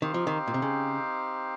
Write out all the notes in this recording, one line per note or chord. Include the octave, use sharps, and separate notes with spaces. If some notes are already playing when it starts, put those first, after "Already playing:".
D#3 C4 D#4 G4 C5 F5
F3
D#3
A#2
C3
C#3